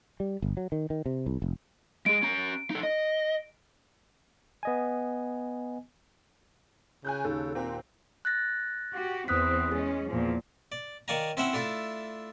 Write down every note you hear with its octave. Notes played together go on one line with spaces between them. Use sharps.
G3
G1
F#3
D#3
D#3
C3
C2
F1
G#3 G#4 D7
C#4 A#5
D#4 A4
D#5
B3 D#5 G#5
C#3 G#5 F#6 G6
D#2 A4
A#2 C4
F#6 A6 A#6
F#4 G4
E2 B3 C4 D#6 F#6 B6
G#3 C#4 G#4
E2 A#2 F3
D5
D#3 C#5 D5 F5 G#5 A#5
C4 C#4 E4 C5 E5 F#5
A3 D4 E4 F4